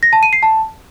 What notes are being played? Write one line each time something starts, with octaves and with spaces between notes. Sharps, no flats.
A#6
A5
D#7
C7
A5